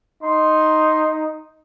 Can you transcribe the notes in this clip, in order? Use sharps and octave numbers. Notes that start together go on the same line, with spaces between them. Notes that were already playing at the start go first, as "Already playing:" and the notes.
D#4 C6